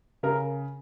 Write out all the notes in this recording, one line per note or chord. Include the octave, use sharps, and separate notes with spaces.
C#3 A#4